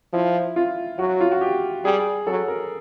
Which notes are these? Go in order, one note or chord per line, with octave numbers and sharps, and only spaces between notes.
F3 E4
F4
F#3 F#4
F4
F#4
G4
G3 G#4
F#3 A4
A#4